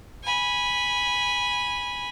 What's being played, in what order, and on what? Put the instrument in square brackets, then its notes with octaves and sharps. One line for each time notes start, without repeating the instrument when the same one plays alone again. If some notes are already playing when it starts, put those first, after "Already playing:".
[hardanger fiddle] G#5 B5